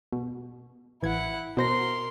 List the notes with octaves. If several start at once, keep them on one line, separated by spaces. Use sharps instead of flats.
B2
A1 E3 E4 F#5 G#6
B2 A#4 C5 C6 A#6